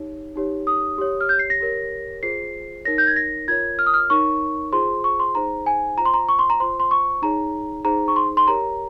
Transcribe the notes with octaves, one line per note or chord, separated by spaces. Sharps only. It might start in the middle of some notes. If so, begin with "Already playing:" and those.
Already playing: D#4 G4 C#5
D#4 G4 C#5
D#6
G4 C#5
F6
G6
C7
A#6
G4 A#4 C#5
F4 G#4 C5 C7
D#4 A#4 C#5 A#6
G6
G#6
A#6
F4 A#4 C#5 G#6
F6
D#6
F6
D#4 A#4 C#5 C#6
F4 G#4 C5 C6
C#6
C6
D#4 G#4 C5 A#5
G#5
F4 C5 A#5 C6
A#5
C#6
C6
A#5
F4 C5 C6
C6
C#6
D#4 G#4 C#5 A#5
D#4 G#4 C5 A#5
C#6
C6
C6
G4 A#4 C#5 A#5